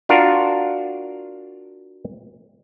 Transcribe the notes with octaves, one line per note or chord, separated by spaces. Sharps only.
D4 F4 F#4 A#4